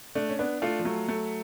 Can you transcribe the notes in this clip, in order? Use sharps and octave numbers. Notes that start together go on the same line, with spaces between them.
A3 D4
C#4
B3 D4
A3 F4
F3
F#3 A3
A3